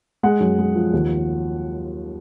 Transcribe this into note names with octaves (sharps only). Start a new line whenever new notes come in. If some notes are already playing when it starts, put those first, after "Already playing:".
G#3 F#5
F#2
G#3
F3
D#2